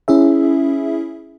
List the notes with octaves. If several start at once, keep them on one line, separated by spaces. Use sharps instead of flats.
C#4 E4 G#4 E5